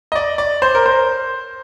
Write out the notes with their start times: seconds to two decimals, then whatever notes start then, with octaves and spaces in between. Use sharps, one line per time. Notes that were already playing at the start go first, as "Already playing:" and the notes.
0.12 D#5
0.15 D5
0.38 D5
0.62 C5
0.75 A#4
0.86 C5